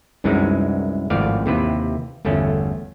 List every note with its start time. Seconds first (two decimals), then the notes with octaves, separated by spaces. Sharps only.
0.24 C2 F#2 E3 F#3 G#3 D#4
1.10 G#1 F2 A2 D5 F5
1.46 D#2 C3 E3 B4
2.25 G1 E2 A3 C#4